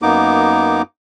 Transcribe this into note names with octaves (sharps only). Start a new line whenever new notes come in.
F#2 A#3 B3 D#4 D6